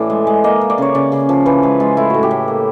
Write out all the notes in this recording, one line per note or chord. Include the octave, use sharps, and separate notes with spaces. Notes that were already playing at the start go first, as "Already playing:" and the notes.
Already playing: A2 E3 D5
G#3
G#3
A#3 D#5
A#3
D5
C#3 C#5
C#3 D5
C#3
F3
E3 B4
G#3 G#4
G#3 F4
A2 E4
A2 F#4
G4
A2
A#3